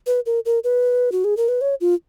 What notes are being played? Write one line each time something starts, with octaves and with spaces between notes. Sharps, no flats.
B4
A#4
A#4
B4
F#4
G#4
A#4
B4
C#5
F4